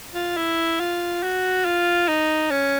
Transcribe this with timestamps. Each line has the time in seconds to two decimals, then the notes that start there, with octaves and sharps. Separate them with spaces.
0.14 F4
0.37 E4
0.80 F4
1.23 F#4
1.65 F4
2.08 D#4
2.51 C#4